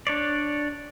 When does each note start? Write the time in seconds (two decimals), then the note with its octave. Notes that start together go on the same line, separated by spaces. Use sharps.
0.07 D4 C#5 D5